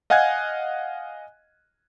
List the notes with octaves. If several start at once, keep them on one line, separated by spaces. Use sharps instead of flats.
D#5 F5 F#5 G#5 F#6 G#6